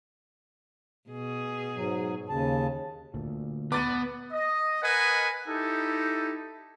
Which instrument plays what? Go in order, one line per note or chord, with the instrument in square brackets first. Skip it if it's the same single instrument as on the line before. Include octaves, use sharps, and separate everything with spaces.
[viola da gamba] B2 G#4
[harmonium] G#2 F#3
D#2 C#3 A5
[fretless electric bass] D2 A#2
[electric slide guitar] B3 [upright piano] D6 A6 D#7
[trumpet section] D#5
A#4 B4 D#5 F#5 G#5
D#4 E4 G4 A4